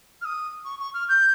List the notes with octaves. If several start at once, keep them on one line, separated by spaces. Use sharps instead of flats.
F6
D#6
C#6
C#6
F6
G6